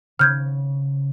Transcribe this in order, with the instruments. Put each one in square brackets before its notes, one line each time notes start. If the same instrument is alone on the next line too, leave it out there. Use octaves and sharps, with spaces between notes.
[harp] C#3 [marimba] F6 G6 G#6